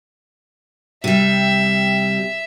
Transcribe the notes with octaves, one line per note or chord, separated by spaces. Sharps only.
C3 G3 E5